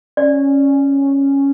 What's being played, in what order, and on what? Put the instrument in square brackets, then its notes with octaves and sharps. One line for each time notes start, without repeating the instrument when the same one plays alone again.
[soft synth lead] C#4 [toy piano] D5